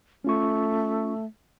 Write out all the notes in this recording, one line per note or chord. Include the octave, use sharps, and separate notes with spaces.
A3 C#4 F4 C#6